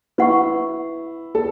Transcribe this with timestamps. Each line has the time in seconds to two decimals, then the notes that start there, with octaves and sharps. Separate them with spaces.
0.18 E4 B4 F#5 C#6
1.35 A4